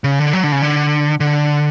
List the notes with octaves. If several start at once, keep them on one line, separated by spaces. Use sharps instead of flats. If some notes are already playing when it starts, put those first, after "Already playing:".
C#3
D3
F#3
D3
C#3
D3
D3